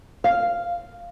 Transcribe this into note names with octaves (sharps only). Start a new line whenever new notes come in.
F5